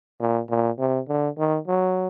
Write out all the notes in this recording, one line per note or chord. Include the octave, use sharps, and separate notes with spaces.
A#2
A#2
C3
D3
D#3
F#3